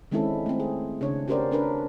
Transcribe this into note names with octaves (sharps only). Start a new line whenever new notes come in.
D#3 G#3 C4 C#4 E4 A4
A3 C4
G#4
C#3 D4 C#5
C#4 F#4 G4 A#4 C5 D5
C#4 D4 A#4 B4